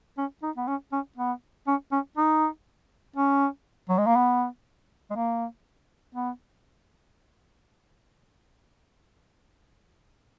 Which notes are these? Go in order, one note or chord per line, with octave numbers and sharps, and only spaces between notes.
C#4
D#4
B3
C#4
C#4
B3
C#4
C#4
D#4
C#4
F#3
G#3
A#3
B3
G#3
A#3
B3